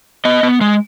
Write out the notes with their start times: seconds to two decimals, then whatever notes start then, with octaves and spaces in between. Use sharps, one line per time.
0.25 B3 D#5
0.43 B3
0.61 G#3